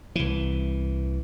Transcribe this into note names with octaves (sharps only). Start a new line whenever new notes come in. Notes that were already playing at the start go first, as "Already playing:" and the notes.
C2 E3